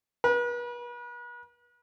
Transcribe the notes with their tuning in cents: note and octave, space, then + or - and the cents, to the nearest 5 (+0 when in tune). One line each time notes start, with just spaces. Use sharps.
B4 -40